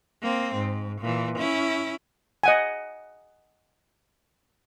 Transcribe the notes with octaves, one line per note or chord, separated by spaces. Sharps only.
A#3 C4
G#2
A#2 E3
C#4 E4
D#5 F#5 G#5